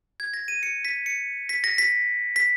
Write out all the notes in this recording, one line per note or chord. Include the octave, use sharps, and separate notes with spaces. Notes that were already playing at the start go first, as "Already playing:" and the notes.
G#6
A#6
D#7
C#7
B6
C#7
B6
A#6
B6
B6